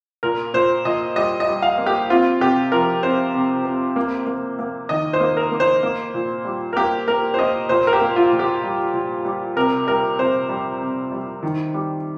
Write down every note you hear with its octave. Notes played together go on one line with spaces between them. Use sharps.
A#2 A#4
A#2 C5
A#2 D#5
G3 D#5
D#5
G3
F5
A#3
G4
C4 F4
C3 G4
F3 A#4
C4 C5
C3
C4
A#3
A#3
A#3
D#3 D#5
C5
A#3
A#4
A#3
C5
A#3
A#2
G3
A#4
A#3 G4
A#3 A#4
C5
A#3 D#5
A#2 C5
A#4
G4
A#3
F4
A#2
G4
G3
A#2
G3
C3 A#4
G3 A#4
C3 C5
G3
C3
G3
D#3
G3